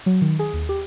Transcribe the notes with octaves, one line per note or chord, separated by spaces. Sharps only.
F#3
D#3
G#4
D#2
G4